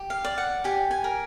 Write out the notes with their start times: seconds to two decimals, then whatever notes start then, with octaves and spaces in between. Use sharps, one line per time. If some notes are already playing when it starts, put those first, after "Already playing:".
Already playing: G4
0.10 F5
0.24 D5
0.38 F#5
0.64 G4 G#5
0.91 G#5
1.04 A#4